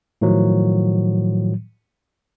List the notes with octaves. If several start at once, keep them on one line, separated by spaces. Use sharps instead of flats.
A2 D#3 F3 F#3